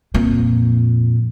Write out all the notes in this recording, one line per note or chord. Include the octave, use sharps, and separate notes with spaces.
F2 A#2